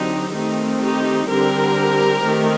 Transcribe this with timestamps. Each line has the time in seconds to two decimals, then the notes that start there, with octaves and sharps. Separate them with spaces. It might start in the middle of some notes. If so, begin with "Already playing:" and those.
Already playing: D3 F#3 C4 D#4 G4
0.33 D#3 A3 C4 D#4
0.81 D#4 G4
1.28 D3 G3 C4 G4 A#4
2.23 D#3 A3 C4